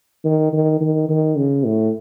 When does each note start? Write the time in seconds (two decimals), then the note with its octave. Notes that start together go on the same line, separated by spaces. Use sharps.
0.25 D#3
0.53 D#3
0.81 D#3
1.09 D#3
1.37 C#3
1.65 A2